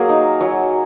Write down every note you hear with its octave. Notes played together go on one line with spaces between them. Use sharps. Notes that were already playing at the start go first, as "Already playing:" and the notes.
Already playing: F#3 A#3 G#4 A#4
D#4
F#3